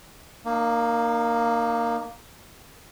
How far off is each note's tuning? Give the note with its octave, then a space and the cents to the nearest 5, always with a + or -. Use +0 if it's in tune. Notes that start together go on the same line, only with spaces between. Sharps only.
A#3 +0 D#4 -40